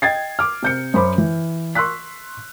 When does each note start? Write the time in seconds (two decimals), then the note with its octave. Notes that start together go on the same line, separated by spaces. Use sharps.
0.02 D#5 G5 G#6 A6 C7
0.39 D6 F6
0.63 C3 G6 C#7
0.94 F#2 C5 B5 D6
1.18 E3
1.75 C6 C#6 E6 F#6 B6